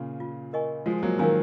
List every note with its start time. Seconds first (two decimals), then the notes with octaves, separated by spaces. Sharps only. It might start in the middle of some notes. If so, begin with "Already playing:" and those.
Already playing: A#2 C#3
0.20 F4
0.53 A#4 D#5 G#5 C#6
0.86 F3 G#3 F#4
1.03 F#3 A#3
1.19 D#3 F#3 A#4 F5 G#5